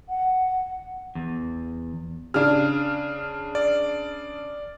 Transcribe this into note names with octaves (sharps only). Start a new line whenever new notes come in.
F#5
E2
C#3 D4 F6
D5